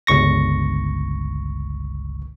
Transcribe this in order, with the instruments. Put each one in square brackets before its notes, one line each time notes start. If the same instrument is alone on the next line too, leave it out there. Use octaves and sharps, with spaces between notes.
[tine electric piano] G1 C#2 C#6 A#6